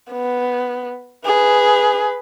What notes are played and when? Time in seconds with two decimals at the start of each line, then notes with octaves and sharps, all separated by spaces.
0.11 B3
1.25 G#4 B4